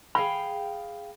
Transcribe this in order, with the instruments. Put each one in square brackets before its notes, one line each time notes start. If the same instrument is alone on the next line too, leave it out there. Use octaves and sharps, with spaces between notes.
[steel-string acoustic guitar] G#4 F5 G5 [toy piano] B5